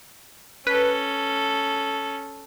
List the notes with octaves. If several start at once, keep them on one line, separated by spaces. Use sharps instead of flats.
C#4 A4 B4